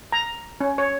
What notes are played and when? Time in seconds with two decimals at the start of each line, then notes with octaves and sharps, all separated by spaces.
0.12 A#5
0.61 C#4
0.78 C#5